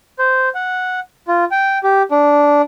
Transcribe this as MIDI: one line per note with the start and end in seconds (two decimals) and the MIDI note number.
0.19 0.49 72
0.55 1.00 78
1.28 1.45 65
1.51 1.78 79
1.84 2.03 67
2.11 2.62 62